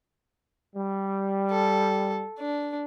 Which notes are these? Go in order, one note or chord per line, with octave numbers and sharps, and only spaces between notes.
G3
A4
D4